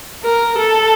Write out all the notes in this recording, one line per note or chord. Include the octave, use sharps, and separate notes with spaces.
A#4
A4